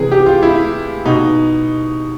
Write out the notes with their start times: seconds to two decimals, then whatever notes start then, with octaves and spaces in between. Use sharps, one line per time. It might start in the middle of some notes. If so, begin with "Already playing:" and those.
Already playing: C3 E3 G#4
0.12 G4
0.26 F4
0.43 E4
1.05 B2 D#4